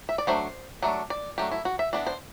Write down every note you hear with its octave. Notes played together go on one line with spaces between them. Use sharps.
E5
D5
F#3 A3 D4 C5
F#3 A3 D4 D5
D5
F#3 A3 D4 G4
E4
F#4
E5
E3 B3 D4 D5
C5